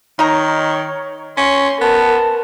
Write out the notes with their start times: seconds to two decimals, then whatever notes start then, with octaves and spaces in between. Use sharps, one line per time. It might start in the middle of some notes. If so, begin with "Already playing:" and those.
0.19 D#3 D#4 C#5 A#5
1.37 C#4 C6 C#6
1.81 B3 A#4 A5